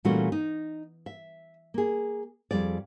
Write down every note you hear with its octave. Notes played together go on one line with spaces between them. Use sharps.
A#2 E3 G3 A3 C#4 F#4
D#4
E5
A#3 G#4
F2 G3 G#4 D5